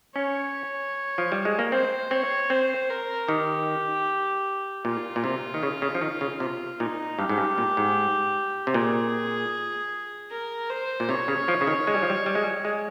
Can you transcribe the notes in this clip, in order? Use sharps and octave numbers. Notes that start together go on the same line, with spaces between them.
C#4 C#5
F3
G3
G#3
A#3
C4 C5
C4 C#5
C4 C5
A#4
D#3 G4
A#2 F4
A#2
C3
D#3
C#3
C#3
F3
D#3
C#3
C3 F4
A#2 D#4
G2 G4
G#2
G2
A#2
G#2
C3
A#2 G#4
A#4
C5
A#2
C3 C#5
C#3
F3
C#3
D#3
G#3
G3
F3
G3
G3
G#3
G3
G#3